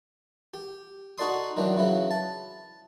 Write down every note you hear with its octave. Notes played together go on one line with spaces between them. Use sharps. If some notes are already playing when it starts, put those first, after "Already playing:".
G4
D#4 F#4 A4 D5 C6 D#6
D#3 E3 F#3 D4
C#3 E3 F#3 E4
A5